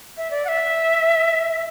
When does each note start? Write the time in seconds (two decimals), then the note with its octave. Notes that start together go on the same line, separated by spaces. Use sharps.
0.17 E5
0.31 D5
0.45 F#5
0.48 E5